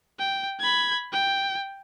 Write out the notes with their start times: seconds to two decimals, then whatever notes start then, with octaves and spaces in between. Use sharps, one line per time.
0.19 G5
0.60 B5 G#6
1.12 G5